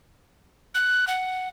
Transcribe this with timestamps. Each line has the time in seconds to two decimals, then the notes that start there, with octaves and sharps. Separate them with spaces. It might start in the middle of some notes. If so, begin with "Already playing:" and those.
0.75 F#6
1.08 F#5